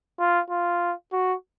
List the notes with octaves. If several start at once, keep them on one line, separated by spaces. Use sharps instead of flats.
F4
F4
F#4